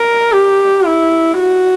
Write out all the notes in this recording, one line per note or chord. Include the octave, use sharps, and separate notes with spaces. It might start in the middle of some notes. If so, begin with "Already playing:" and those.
Already playing: A#4
G4
E4
F#4